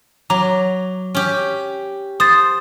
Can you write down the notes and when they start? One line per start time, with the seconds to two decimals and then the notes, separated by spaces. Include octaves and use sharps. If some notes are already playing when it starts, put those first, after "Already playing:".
0.30 F#3 A#5 D6
1.15 C#4 G4
2.20 C5 D#6 A6